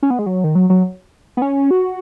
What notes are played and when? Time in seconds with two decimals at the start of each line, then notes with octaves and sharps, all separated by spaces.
0.03 C#4
0.10 B3
0.19 G#3
0.26 F#3
0.44 D#3
0.55 F#3
0.70 F#3
1.37 B3
1.42 C#4
1.71 F#4